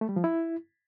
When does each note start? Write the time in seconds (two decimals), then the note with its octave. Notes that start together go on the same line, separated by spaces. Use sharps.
0.01 A3
0.09 G3
0.16 F3
0.24 E4